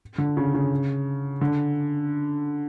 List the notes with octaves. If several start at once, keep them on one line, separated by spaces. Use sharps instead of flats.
D3
C#3
C#3
D3